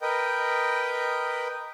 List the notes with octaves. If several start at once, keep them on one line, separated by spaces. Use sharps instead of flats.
A#4 B4 D#5 G5